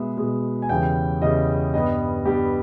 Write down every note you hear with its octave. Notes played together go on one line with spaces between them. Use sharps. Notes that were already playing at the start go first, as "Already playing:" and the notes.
Already playing: B2 G#3 B3 E5
B2 G#3 B3
G#5
E2 C#3 E3 G3 G5
E2 C#3 E3 G3 D#5
G2 G3 B3 D#5
G2 G3 B3 G4